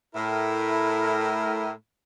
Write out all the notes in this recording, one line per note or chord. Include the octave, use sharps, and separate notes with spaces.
A2 E4 A#4